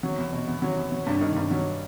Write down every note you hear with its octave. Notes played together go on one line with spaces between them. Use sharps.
F#3
E2
B2
E2
F#3
E2
F#3
G2
D#3
G2
F#3